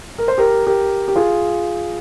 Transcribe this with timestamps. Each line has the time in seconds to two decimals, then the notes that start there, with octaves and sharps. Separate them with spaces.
0.18 A#4
0.28 C5
0.38 G4 A#4
0.67 G4 A#4
1.08 G4
1.16 F4 G#4